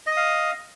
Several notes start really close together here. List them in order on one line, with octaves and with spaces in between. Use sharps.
D#5 D#6 F5